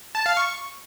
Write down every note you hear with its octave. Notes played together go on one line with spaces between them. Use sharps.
A5
F5
C#6